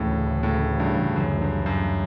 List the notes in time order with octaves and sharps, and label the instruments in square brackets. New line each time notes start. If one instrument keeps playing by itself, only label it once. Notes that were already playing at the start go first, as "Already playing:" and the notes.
Already playing: [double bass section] D2 C#3 E3 [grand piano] A2
[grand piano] A2
G2
F#2
G2
F#2